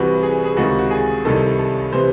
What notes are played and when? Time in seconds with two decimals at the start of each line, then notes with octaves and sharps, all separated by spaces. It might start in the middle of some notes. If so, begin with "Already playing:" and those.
Already playing: C2 C3 E3 F#4
0.23 G#4
0.45 G#4
0.57 C#2 C3 D#3 F#4
0.79 F#4
0.91 G#4
1.25 C2 C3 D#3 A4
1.59 A4
1.93 C3 E3 C5